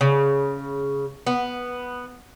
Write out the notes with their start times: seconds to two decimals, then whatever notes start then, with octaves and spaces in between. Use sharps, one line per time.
0.01 C#3
1.27 B3